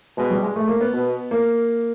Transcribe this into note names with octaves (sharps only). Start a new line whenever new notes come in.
B2 G#3
G3
G#3
A3
A#3
B3
B2
A#3